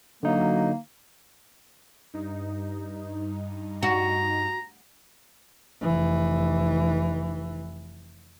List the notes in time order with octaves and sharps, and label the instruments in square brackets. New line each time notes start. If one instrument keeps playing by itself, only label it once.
[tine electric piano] D3 D#4 [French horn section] F#3 [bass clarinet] A#3
[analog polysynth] G2 D#4
[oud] F#4 [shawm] A#5
[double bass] F1 E3